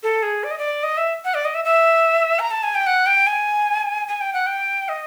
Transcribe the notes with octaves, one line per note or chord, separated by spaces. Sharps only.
A4
G#4
D5
D#5
D5
D#5
E5
F#5
D5
D#5
E5
E5
A#5
A5
G#5
G5
F#5
G5
G#5
G#5
G5
F#5
G5
D#5